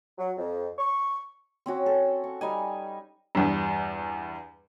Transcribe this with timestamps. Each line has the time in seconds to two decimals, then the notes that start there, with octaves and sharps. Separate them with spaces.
0.18 F#3
0.37 F2
0.79 C#6
1.66 C4 C#4 F#4
1.86 A4
2.24 C#6
2.41 G3 D#4 G#5
3.35 E2 G2